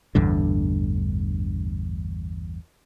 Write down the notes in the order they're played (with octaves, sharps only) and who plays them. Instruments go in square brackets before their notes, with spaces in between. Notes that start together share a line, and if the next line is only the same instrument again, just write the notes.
[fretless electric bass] A1 E2 G2 D3